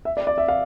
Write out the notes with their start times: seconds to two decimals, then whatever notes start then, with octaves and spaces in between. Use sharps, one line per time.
0.05 E5
0.17 D5
0.27 D5
0.38 E5
0.48 F5